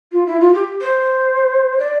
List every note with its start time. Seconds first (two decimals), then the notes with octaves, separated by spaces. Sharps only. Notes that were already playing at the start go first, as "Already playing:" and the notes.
0.12 F4
0.26 E4
0.40 F4
0.54 G4
0.81 C5
1.79 D5